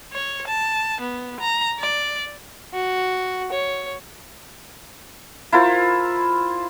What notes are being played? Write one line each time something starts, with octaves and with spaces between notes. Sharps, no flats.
C#5
A5
B3
A#5
D5
F#4
C#5
E4 F4 A#4 C5